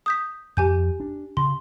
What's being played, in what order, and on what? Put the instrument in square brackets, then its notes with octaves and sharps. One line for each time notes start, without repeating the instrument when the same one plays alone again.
[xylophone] D#6 G6 B6
[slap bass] F2 [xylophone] G4 G#5 G6
[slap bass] D4
[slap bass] C#3 [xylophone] C6